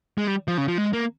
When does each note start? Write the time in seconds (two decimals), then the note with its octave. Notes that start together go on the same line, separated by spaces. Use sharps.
0.18 G#3
0.27 G3
0.48 F3
0.58 C#3
0.68 F3
0.78 G#3
0.93 A#3